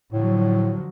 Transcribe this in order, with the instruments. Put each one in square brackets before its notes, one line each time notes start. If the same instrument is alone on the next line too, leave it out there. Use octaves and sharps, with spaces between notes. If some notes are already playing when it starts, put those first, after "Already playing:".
[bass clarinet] A2 [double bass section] D3 F3 F#3